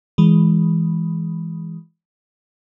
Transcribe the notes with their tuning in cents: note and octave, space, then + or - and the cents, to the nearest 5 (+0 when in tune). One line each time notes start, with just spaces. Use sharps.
E3 +0 G#3 +0